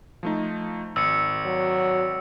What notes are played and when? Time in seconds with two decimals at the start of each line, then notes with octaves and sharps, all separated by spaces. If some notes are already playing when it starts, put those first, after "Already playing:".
0.23 F3 A3 D#4
0.96 G#1 E6 C#7
1.46 F#3